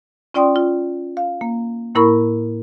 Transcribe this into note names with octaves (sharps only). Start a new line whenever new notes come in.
C#4 F4 D5 G5 C6 D#6
F4
F5
A#3
A2 A#3 E4 A#4 B5 C#6